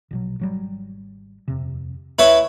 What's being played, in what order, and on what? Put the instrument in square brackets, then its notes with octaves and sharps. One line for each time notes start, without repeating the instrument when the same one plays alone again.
[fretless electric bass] A#1 B2 F#3
G#1 F#3 G3
D#1 F2 C3
[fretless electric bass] D2 [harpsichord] E4 B4 C#5